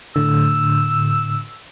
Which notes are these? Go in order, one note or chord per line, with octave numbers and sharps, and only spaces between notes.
A2 D3 E6